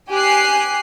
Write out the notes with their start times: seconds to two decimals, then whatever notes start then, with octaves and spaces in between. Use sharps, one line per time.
0.10 G4 G#5 F#6 C7